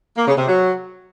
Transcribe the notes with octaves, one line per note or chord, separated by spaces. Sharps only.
A#3
C#3
C3
F#3